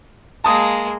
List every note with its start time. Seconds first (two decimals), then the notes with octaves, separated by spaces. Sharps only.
0.44 G#3 A#3 A5 D#6